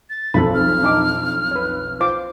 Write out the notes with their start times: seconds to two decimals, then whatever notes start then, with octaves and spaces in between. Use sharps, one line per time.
0.10 A6
0.34 B1 F2 A4 B5
0.54 F6
0.83 D4 D#4 D6
1.51 B4 C#5
2.00 F4 C5 D6